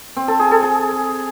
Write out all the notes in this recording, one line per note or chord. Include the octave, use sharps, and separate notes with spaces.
C4
A4
G#4
A4
G#4